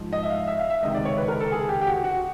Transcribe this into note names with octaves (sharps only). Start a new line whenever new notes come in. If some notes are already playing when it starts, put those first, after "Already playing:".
Already playing: G#2 F3
D#5
E5
F5
E5
F5
E5
C#2 C3 D#3 D#5
D5
C#5
B4
A#4
A4
G#4
G4
G4
F#4
F#4